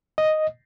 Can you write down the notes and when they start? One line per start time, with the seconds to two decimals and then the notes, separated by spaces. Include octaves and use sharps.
0.18 D#5